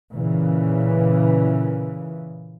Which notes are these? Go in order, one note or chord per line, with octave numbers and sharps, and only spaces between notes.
A#2 C#3 E3